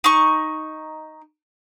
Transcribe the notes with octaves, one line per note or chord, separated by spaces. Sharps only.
D#4 C#6